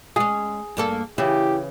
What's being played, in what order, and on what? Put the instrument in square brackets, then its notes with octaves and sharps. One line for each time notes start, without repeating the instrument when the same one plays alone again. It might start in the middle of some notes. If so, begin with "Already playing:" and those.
[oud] G#3 C#4 [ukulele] G#4
[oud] G2 A#3 A4
[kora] C#3 E3 [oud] E4 [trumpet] G4